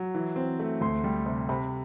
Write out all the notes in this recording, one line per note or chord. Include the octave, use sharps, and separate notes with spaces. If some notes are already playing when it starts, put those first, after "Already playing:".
Already playing: F#3
E3
C4
A3
D2 C6
G3
C3
C3 B5